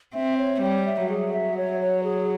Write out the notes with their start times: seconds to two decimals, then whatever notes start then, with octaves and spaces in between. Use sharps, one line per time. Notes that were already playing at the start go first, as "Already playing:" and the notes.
0.14 C4 E5
0.37 C#5
0.61 G3 C#5
0.86 E5
1.09 F#3 G#4
1.33 E5
1.57 C#5
1.81 C#5
2.04 G#4